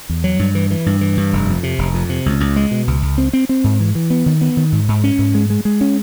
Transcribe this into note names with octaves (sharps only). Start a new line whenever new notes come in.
E2
F#3
G2
E3
E3
G2
E3
G2
F1
F2
C3
F1
F2
C3
C#2
C#2
G#3
B2
C#2
C#2
C4
C4
C4
G#2
E3
E3
B3
D#3
B3
D#3
G#2
G#2
C#4
G#2
G#3
G#3
G#3
C#4